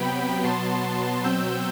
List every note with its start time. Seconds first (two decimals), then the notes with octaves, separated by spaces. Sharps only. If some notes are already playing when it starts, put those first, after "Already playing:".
Already playing: C3 F#3 B3 G5 B5
0.44 B2 F#3 B3 A5 C6
1.24 B2 F#3 C4 E6 G6